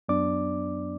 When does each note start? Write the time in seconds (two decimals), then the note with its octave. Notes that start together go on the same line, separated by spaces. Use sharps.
0.09 F#2 F#3 B3 D4 D5 D6